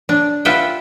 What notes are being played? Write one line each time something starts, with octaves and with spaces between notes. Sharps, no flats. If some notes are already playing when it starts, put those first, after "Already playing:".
D4
F4 B4 E5 F#5 G5